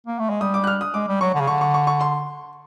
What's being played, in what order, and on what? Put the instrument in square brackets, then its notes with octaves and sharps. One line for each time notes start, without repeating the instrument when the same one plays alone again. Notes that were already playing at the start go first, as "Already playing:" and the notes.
[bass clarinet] A#3
A3
G#3
[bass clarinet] G3 [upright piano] D#6
[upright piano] D6
F#6
F6
D#6
[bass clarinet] G#3 [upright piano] D6
[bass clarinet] G3
[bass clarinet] F#3 [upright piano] C#6
[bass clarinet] D3
C#3
[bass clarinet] D3 [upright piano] C#6
[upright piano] C#6
C#6
C#6
C6